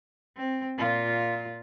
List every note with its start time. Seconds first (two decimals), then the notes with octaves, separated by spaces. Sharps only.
0.37 C4
0.78 A#2 F4